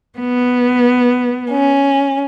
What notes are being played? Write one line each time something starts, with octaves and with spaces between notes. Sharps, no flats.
B3
C#4